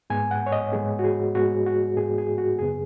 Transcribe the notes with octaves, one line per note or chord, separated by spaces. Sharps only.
G#2 G#3 B3 G#5
F#5
C#5
D#5
G#2 G#3 B3 G#4
F#4
G#4
G#2 G#3 B3 F#4
F#4
G#2 G#3 B3 G#4
G#4
F#4
F#2 C#3 B3 G#4